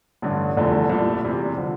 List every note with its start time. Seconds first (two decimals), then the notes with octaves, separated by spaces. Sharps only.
0.22 A1 G2 D3
0.56 F1 E2 D3 F3 A3
0.89 C2 A#2 A3
1.24 E2 C3 G3
1.58 D3 F3